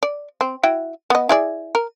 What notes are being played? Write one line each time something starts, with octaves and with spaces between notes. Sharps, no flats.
D5
C4
E4 F#4 G5
B3 D#5
E4 G#4 D5
A#4